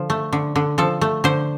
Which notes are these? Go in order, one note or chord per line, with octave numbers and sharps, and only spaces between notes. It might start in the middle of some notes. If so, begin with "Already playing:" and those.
Already playing: D3 F3
A3
D3
D3
F3 A4
A3
D3 C5